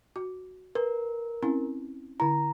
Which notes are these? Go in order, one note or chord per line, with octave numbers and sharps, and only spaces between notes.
F#4
A#4 B4
C4 C#4 E4
D3 E4 A#5